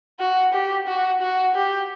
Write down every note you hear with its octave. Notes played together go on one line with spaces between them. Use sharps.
F#4
G4
F#4
F#4
G4